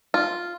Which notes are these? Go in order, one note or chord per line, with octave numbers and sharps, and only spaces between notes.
F4